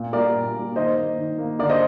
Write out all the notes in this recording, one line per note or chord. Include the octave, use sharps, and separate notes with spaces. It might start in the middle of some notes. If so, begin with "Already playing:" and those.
Already playing: A#2
G3 A#3 A#4 D5
A#2
G3 A#3
D#3 C5 D#5
A#3
D#3
A#3
D3 A#4 D5
C5 D#5